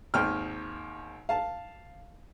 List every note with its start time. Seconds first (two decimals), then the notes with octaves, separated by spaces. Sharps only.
0.14 G#1 D#2 G5 F6
1.29 F5 A5